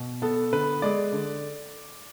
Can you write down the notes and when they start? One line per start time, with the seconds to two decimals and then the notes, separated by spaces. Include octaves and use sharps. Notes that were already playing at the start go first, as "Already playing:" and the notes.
Already playing: B2
0.22 B3 A4
0.52 D3 B4
0.82 G#3 D5
1.12 D3